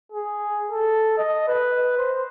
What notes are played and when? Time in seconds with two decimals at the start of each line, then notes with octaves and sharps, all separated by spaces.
0.12 G#4
0.71 A4
1.18 D#5
1.48 B4
1.98 C5